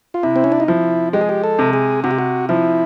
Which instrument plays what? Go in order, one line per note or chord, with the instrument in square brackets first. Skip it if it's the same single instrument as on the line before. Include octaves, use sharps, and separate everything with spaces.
[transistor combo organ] F4
[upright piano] C3 [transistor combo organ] E4
[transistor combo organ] C4
C#4
D4
D#4
[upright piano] F3 [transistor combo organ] E4
[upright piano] G#3 [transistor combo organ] G4
[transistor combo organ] G#4
G4
A4
[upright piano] C3
[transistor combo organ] G#4
[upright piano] C3 [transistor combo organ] F#4
[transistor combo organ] G4
F#4
[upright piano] F3 [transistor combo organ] E4